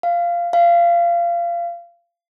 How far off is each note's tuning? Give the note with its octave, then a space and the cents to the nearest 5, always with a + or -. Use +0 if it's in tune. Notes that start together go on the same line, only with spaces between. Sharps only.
F5 -10
F5 -20